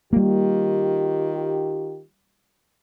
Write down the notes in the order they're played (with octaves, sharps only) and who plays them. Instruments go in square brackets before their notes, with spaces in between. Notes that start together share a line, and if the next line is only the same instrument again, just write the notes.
[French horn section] D#3 F4 G4 [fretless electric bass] G3 A#3